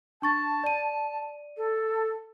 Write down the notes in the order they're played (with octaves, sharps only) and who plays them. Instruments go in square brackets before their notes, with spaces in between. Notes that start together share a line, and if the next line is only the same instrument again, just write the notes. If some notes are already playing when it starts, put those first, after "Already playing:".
[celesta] D4 C#6 A6 [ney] A5
[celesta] D5 D#7
[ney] A4